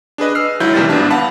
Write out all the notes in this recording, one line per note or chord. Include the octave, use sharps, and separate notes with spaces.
D4 G#4 B4 D#5
E6 F6 C7
C#2 F#3 E4 G6
A1 D#2 C3 E3 G3 A6
G#1 B3 D4 A5
F5 F#5 A5 B5